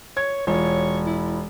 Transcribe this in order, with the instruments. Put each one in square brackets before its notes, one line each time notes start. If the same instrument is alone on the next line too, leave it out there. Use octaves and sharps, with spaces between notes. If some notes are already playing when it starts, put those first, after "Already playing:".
[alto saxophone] C#5 [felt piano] G#6
[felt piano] E1 F4 [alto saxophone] C#5
[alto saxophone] E4